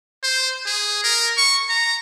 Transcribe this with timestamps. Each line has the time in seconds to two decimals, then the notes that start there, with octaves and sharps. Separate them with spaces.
0.23 C5
0.66 G#4
1.04 A#4
1.37 C#6
1.69 A#5